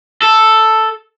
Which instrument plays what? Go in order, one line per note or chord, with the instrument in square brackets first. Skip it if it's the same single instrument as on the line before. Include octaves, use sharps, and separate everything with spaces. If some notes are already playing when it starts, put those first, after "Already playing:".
[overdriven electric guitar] A4